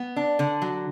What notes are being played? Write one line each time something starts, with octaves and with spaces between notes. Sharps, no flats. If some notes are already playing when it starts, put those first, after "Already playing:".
Already playing: B3
D4
D3
F#3